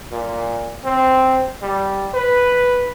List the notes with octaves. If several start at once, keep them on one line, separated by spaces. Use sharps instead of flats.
A#2
C4
G3
B4